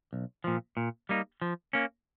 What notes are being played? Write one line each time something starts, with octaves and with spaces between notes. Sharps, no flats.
B1
A#2 F3
A#2
G3 A#3 D#4
F3
A#3 C#4